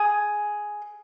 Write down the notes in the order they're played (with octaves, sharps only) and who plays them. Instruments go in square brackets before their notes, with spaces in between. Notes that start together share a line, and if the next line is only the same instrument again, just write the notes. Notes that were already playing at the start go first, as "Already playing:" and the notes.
Already playing: [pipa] G#4